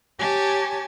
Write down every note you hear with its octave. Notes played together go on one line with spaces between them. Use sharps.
G4 C#5 G#5 A5